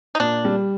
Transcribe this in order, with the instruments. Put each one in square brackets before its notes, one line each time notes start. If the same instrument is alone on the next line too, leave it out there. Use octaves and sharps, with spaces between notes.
[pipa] D#4
[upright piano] A#2 [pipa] D4
[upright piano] G3